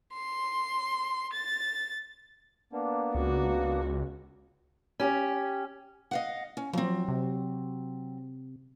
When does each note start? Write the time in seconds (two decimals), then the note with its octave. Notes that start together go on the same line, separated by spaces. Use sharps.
0.13 C6
1.33 A6
2.73 A#3 B3 D4
3.15 C#2 F#4
5.00 C#4 G4
6.11 D#5 F5 F#5
6.57 C#4
6.73 F3 F#3 C4
7.08 C3